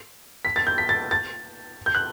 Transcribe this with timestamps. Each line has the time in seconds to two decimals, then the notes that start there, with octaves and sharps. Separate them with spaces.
0.45 B6
0.56 A6
0.67 G6
0.78 B6
0.89 A6
1.11 A6
1.86 G6
1.95 F#6